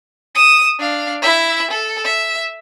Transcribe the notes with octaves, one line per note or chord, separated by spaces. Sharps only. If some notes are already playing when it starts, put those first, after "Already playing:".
D#6 E7
D4 F5
E4 E5
A4
E5